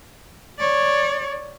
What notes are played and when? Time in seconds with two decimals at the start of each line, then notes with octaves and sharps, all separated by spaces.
0.59 C#5 D5